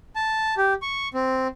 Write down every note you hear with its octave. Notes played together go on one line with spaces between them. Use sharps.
A5
G4
C#6
C4